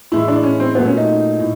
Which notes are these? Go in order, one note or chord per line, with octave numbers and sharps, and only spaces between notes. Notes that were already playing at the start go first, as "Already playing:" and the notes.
A2 E3 G#3 E4
D4
C#4
C4
A#2 F#3 A3 B3
C#4
D#4
A2